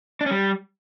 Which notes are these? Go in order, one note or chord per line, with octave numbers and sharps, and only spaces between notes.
D4
C#4
G3